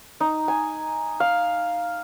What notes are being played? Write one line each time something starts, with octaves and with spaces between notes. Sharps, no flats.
D#4
G#5
F5